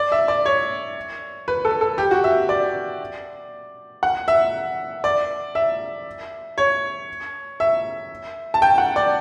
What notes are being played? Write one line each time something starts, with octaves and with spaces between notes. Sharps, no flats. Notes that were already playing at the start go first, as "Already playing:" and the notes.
Already playing: D5
E5
D5
C#5
B4
A4
A4
G4
F#4
E5
D5
F#5
E5
D5
E5
C#5
E5
A5
G5
F#5
D5